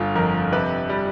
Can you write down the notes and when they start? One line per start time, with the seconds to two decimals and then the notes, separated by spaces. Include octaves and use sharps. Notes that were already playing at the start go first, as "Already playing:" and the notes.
Already playing: G1 F4
0.15 F2 A#4
0.52 C3 B4
0.89 G3